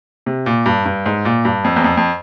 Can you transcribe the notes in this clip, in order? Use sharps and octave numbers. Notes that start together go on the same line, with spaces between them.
C3
A#2
G2
G2
G#2
A#2
G2
F2
E2
F2
F2